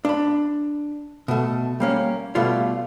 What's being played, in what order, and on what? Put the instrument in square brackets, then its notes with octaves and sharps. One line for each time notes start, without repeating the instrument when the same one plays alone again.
[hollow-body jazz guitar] D4 B5
B2 A3
G3 A#3 C#4
B2 G3 A3 F4